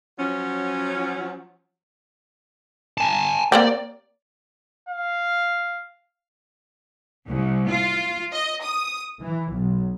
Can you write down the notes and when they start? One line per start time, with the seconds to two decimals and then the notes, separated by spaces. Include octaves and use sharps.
0.19 F3 F#3 C#4
2.98 G#5 A5
3.52 A#3 C4 G4 D5
4.89 F5
7.28 C2
7.68 F4
8.32 D#5
8.63 D#6
9.21 E3
9.51 B1